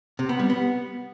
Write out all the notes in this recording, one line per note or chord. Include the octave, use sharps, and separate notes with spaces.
C3
B3
G3
B3